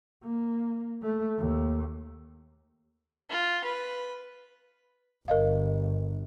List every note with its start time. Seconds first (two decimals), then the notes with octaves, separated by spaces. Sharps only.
0.23 A#3
1.02 A3
1.38 D#2
3.30 F4
3.64 B4
5.28 G1 A#4 D#5 F5